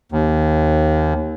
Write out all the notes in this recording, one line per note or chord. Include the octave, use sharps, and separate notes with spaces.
D#2